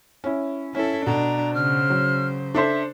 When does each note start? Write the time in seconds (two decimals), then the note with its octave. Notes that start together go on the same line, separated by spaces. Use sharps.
0.24 C#4 E4
0.75 C#4 E4 A4
1.07 B2 D4 A#5
1.55 C#3 C5 F6
1.90 F#3
2.55 D4 A4 C5 E5